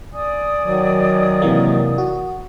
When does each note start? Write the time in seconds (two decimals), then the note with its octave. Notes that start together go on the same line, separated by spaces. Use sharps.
0.12 D5 G#5 D#6
0.64 D#3 F#3
1.42 C3 E3 A#3
1.98 F#4